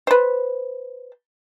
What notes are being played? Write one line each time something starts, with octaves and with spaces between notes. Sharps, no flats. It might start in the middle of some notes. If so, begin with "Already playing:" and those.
B4 C5